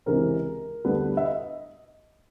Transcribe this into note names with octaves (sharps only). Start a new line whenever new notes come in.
C#2 C3 E3 G#3 C4 A#4
D2 D3 G3 B3 B4
E5
D#5